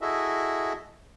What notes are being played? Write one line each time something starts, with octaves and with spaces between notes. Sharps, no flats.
E4 F#4 G#4 A4 D#5 E5